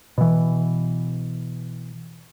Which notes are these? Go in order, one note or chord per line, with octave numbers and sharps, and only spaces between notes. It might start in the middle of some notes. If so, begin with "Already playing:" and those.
B2 E3